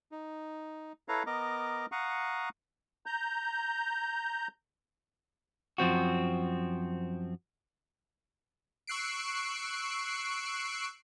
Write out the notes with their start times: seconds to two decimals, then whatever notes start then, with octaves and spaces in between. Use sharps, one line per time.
0.12 D#4
1.08 E4 A4 B4 C#5 F5 A#5
1.26 B3 A#4 D#5 A#5 D6
1.92 F5 F#5 A#5 C#6 D#6
3.06 A#5 G6
5.78 F#2 F3 C4 F#4
8.87 C#6 E6 F#6 C7 D7